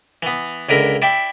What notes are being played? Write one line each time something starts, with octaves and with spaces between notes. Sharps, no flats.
E3 B3
C#2 D3 E4 A#4
E4 D5 E5 G5